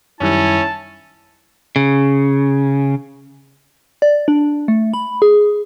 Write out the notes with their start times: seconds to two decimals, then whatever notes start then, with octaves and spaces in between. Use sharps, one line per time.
0.21 F#2 D#3 G3 C#4 E4 A5
1.76 C#3
4.02 D5
4.28 D4
4.68 A3
4.94 B5
5.22 G#4